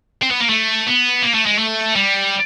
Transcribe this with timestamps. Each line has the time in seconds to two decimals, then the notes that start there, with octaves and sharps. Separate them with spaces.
0.22 C4
0.31 B3
0.40 A#3
0.49 A3
0.87 B3
1.23 A#3
1.35 A3
1.46 G#3
1.59 A3
1.96 G3